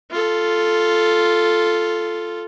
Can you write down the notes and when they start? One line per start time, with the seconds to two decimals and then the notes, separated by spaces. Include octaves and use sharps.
0.11 F4 A4